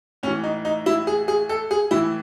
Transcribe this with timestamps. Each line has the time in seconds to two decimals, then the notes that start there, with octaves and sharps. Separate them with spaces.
0.23 A2 C#4
0.27 E3
0.43 D#4
0.65 D#4
0.86 E4
1.07 G#4
1.28 G#4
1.49 A4
1.71 G#4
1.91 A2 E3 E4